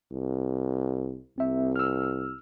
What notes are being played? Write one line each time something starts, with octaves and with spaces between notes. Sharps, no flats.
C2
C2 C4 E5
E6 F6